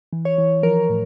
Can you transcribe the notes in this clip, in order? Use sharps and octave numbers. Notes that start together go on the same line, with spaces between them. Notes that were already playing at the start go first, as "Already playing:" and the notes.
E3
C#5
E3
F3 A#4
A2